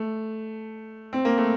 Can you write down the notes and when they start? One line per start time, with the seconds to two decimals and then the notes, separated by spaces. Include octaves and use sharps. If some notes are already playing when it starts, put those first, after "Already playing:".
Already playing: A3
1.13 C4
1.25 A#3
1.38 A3